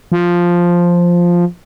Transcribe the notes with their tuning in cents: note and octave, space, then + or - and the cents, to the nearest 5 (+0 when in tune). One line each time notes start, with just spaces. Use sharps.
F3 +0